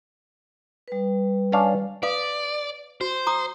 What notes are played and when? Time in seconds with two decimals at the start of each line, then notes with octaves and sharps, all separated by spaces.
0.88 G3 B4
1.52 C#4 D4 F5
2.03 B4 D5 F5 D#6
3.01 F#4 C5
3.27 A#5 D#6